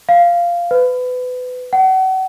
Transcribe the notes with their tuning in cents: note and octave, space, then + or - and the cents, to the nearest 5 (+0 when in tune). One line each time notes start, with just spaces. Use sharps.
F5 -10
B4 +25
F#5 +35